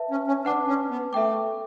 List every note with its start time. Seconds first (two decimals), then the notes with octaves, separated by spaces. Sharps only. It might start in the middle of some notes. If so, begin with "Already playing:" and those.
Already playing: B4 E5 A5
0.11 C#4
0.27 C#4
0.45 D4 B4 F#5 A5 D6
0.67 C#4
0.90 B3
1.13 A3 A4 E5 G5 D6